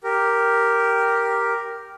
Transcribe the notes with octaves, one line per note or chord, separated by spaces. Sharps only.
G4 A#4